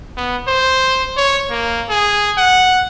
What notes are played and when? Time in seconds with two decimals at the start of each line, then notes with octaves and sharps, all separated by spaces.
0.17 B3
0.48 C5
1.17 C#5
1.51 A#3
1.90 G#4
2.38 F#5